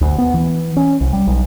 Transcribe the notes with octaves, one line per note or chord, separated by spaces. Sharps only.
D2
B3
E3
C#4
C2
G3
B1